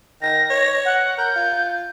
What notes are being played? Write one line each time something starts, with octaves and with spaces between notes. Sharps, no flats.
D#3 A#6
C#5
F#5
A#4 G6
F4